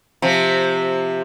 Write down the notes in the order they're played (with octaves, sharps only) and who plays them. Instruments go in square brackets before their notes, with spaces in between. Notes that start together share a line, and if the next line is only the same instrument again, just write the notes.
[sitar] C3 F3